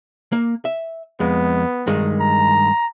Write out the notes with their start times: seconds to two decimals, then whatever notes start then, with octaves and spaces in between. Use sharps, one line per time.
0.32 A#3
0.65 E5
1.20 F2 G#3 B3
1.87 G2 D#3 G#3
2.20 A#5